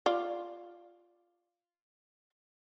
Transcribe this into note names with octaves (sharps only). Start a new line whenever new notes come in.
F4 D5